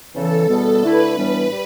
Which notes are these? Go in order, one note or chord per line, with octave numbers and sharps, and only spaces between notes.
E2 C#3 E3 A4
E2 B2 G3 B3
D3 A3 E4 B4
A2 E3 G3 B3 D4
G3